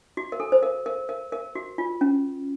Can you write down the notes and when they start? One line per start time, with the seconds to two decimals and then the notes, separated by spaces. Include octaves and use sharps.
0.17 F#4
0.32 A#4
0.40 A4
0.52 C5
0.63 A#4
0.86 A#4
1.09 A#4
1.32 A#4
1.55 F#4
1.78 F4
2.01 C#4